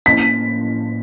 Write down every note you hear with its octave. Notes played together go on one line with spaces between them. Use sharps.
A2 F3 A#3 C#4 E4 B6